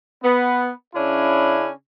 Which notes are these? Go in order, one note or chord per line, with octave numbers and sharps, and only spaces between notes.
B3
C#3 C#4 D4 E4